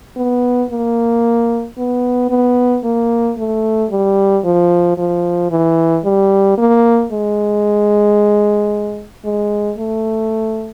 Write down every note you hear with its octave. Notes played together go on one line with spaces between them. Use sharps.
B3
A#3
B3
B3
A#3
A3
G3
F3
F3
E3
G3
A#3
G#3
G#3
A3